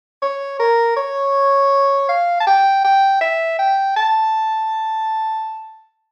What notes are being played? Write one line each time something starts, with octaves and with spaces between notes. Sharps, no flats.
C#5
A#4
C#5
F5
A5
G5
G5
E5
G5
A5